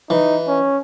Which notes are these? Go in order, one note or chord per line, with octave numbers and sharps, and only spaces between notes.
E3 D#4
C#4